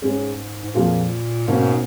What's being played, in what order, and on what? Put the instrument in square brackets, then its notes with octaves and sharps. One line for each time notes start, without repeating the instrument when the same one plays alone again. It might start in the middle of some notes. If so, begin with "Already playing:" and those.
[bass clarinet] G#2 [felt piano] G#3 C#4 G#4 C#5
[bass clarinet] G#2
[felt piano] F2 F3 A#3 F4 G#4 [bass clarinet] A#2
[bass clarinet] G#2 [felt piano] B2 A#3 C#4